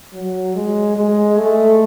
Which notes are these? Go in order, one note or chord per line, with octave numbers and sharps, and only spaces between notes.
F#3
G#3
G#3
A3